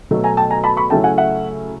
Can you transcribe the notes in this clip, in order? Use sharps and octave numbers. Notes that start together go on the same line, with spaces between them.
B2 F#3 A3
G#5 A#5
G5 A5
G#5 A#5
A5 B5
B5 C#6
C#3 F#3 A3 C#4 E4 G5 A5
F#5 G#5
E5 F#5